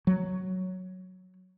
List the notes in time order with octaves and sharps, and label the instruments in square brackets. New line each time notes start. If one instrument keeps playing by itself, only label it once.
[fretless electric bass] F#3